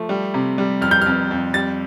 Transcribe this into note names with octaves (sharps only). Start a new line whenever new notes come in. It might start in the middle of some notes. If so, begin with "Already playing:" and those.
Already playing: F3 A3
G3
C3
G3
F2 F6
G6
F2 F6
F2
G3 A6